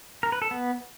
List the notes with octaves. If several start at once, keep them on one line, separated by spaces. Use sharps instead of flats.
A#4
B4
A4
B3